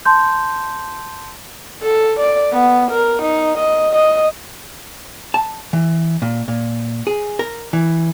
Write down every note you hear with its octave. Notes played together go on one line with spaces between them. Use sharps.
A5 C6 G6
A4
D5
B3
A#4
D#4
D#5
D#5
A5
E3
A#2
A#2
G#4
A#4
E3